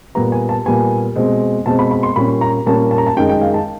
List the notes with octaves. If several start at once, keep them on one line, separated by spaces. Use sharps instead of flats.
A#2 G3 B3 A#5
G#5
A5
A#2 G3 B3 G#5
B2 G#3 C4
B2 G#3 C4 A5
B5
B5
C6
A#2 G3 A#3 C#4 B5
A#5
A#2 G3 A#3 C#4 A5
A5
A#5
A5
F#2 D#3 G#3 G5
G5
F5
A5